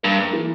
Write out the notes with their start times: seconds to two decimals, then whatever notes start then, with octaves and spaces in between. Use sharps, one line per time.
0.03 G2 A#3
0.19 A#3
0.33 E3